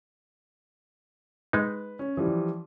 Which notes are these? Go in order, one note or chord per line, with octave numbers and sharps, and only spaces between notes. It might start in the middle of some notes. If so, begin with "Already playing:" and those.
G#3 D#4 B4
C#4
E3 F3 G3